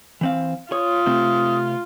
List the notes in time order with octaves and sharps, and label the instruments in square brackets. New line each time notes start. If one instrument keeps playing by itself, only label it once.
[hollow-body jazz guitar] E3 C4 F5
[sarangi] F4 [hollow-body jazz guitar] C#5 [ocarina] D#6
[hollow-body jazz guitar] C3 A3 C4